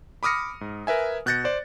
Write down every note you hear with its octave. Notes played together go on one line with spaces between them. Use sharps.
B5 D6 D#6 F6 A#6 C#7
G#2
A#4 B4 E5 G#5
B2 F#6 G6 A6 A#6 C#7
C5 D5